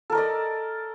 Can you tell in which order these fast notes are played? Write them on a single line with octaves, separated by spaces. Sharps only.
A4 A#4 D#5 D5